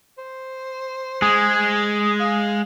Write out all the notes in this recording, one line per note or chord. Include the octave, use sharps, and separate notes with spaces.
C5
G#3 G#4
F5